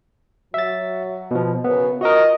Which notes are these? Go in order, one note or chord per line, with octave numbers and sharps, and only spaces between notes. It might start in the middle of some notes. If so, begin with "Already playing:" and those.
F#3 F#4 E5 A6
B2 F3
F#2 C#3 B3
F4 F#4 A#4 C5 D#5